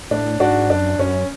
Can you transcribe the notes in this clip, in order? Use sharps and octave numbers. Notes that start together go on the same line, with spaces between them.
A2 D4
G#2 D4 F#4
F#2 D4
F#2 C#4